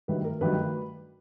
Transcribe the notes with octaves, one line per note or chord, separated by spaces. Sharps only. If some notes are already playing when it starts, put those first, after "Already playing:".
G2 D#3 F#3 A3 B4
A#4
G2 D#3 F#3 A3 B4